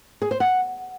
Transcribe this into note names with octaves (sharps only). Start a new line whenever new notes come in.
G#4
C5
F#5